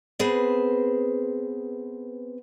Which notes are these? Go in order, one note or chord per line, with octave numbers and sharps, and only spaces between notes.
B3 C4 G#4 B4 C5